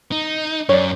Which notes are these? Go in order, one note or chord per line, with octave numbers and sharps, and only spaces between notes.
D#4
F#2 C#5 D5